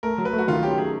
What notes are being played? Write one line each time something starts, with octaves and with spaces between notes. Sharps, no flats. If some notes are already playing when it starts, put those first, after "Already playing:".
A3 A#4
F#3
B4
A3
F#4
D#3 F4
C#4 G4
F#3 G#4